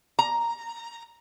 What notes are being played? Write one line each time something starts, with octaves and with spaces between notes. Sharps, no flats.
A#5